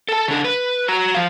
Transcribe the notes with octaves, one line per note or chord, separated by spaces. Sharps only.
A4 A5
C#3 D4
B4
F#4 A#5
F3 F5